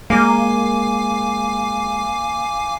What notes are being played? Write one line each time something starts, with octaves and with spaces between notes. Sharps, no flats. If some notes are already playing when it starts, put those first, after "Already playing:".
G#3 A#3 F5 G#5 D6